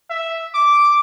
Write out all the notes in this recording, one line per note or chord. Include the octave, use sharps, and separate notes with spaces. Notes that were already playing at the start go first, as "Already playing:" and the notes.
E5
D6